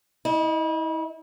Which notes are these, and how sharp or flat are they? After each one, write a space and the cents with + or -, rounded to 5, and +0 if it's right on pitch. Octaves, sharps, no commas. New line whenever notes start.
E4 -35 D#5 +0